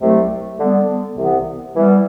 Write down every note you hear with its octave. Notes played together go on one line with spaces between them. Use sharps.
C2 C3 F#3 A3
D3 G3 B3
C2 C3 E3 B3
E3 G3 B3